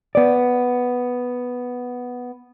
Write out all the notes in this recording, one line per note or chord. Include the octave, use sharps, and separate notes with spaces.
B3 D5